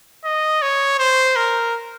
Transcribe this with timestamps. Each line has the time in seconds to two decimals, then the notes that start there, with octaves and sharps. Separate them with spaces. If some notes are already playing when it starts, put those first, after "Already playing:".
0.25 D#5
0.62 C#5
0.99 C5
1.36 A#4